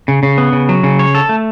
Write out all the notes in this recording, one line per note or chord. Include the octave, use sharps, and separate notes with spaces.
C#3
C#3
B3
C#3
F#3
C#3
C#5
A4
A3